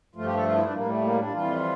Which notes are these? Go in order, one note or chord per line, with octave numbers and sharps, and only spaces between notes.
G2 F3 A3 F4
G4
A4
F4
E4
D4
A2 G3 A#3
A3
A#3
D4
F2 E3 G3 F4